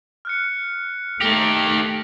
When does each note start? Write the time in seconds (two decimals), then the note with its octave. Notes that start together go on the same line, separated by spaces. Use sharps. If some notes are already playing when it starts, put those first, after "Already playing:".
0.25 F6 F#6 C#7
1.21 D#3 A3 G4 A#6